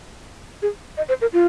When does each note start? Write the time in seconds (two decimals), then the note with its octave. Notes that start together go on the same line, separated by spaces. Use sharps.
0.62 G#4
0.97 D#5
1.09 C5
1.21 A#4
1.33 F4